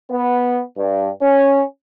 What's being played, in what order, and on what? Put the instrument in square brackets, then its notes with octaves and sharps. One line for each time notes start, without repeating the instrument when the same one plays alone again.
[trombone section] B3
G2
C#4